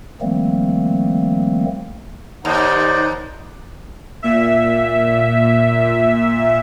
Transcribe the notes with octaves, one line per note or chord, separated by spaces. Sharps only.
D#3 F3 G3 A3 A#3 C4
D#2 D#4 C5 D5 F#5
A#2 E5